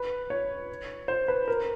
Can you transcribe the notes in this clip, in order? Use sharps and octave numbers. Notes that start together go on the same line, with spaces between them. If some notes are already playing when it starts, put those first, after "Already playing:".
Already playing: B4
C#5
C5
B4
A#4